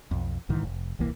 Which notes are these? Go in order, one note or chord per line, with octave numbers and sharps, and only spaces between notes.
B1 F2
B1 G#2 D#3 E3
F1
D#1 C2 E3 A#3